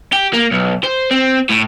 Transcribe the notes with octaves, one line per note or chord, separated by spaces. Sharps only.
G4
A#3
B1
C5
C4
A2